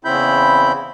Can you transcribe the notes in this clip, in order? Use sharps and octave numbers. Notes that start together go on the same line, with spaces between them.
E2 C#3 C4 E4 B5 G6